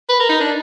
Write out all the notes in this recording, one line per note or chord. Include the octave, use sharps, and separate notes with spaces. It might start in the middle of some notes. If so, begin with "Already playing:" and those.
B4
A#4
D#4
D4